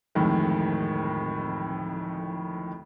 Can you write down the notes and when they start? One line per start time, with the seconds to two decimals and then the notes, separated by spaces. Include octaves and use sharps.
0.15 D1 F2 A2 D#3 G#3